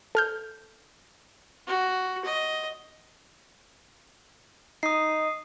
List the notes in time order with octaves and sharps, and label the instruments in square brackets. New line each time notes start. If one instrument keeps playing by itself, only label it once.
[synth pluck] A4 F6 G6
[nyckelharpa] F#4
D#5
[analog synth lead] D#4 [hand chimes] D#6 C7